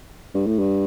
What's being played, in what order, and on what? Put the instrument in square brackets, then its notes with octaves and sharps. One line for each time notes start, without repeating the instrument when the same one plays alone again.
[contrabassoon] G2
A2
G2